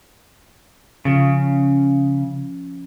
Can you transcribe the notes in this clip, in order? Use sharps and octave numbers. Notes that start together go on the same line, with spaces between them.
C#3 F3 C#4 F4